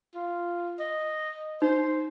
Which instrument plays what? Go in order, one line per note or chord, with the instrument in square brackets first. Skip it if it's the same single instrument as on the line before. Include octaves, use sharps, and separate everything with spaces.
[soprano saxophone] F4
D#5
[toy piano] D#4 [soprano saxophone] C5